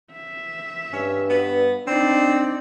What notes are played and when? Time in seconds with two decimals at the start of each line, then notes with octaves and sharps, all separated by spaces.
0.12 E5
0.93 G2 C#4
1.30 B3
1.87 C4 D4 D#4 D5